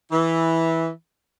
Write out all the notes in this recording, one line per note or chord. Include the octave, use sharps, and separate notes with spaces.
E3